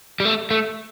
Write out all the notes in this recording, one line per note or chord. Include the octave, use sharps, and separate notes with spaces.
G3
A3
A3